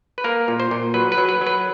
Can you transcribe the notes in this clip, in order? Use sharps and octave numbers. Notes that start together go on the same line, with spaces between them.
B4
A#3 A#4
A#2
C5
A#2
F#3 B4
B4
F#3
B4
F#3
B4